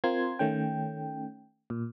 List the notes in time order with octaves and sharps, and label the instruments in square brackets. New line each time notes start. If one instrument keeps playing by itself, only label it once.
[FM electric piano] C4 F4 A#4 C6 G#6
D#3 A3 C#4 G5
A#2